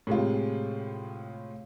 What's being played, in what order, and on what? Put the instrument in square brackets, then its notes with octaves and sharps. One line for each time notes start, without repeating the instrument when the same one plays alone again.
[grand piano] A2 C3 G#3 F4